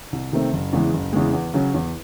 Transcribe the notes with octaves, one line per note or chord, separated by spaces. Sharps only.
C2
C3 D#3 A3 C4
F#1
E2 C#3 E3 G#3
F#1
E2 C#3 E3 G#3
E2
C#3 F#3 C#4
E2